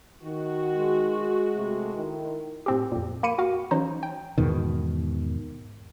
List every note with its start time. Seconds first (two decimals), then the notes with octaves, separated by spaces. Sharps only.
0.23 D#3 F#4
0.74 G#3
1.56 C3 A3
1.93 D#3 E4
2.66 A2 C4 G4
2.92 F2 A#2
3.23 A#3 B5 C#7 D#7
3.38 F#4 F5
3.71 E3 F#3 C#4 D#4 C5
4.03 G5
4.38 E2 G#2 B2 D#3